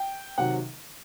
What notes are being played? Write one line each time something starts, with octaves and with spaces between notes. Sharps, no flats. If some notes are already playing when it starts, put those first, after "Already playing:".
Already playing: G5
C3 D#3 F#3 F#5